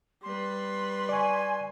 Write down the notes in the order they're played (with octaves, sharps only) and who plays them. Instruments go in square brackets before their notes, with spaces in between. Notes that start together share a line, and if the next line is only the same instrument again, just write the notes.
[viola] G3 B4 [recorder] C6
[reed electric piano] D5 C#6 [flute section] G#5